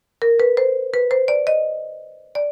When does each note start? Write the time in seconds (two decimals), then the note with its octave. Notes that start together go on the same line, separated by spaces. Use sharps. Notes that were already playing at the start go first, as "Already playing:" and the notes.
0.22 A#4
0.40 B4
0.57 C5
0.94 B4
1.11 C5
1.28 D5
1.47 D#5
2.35 D5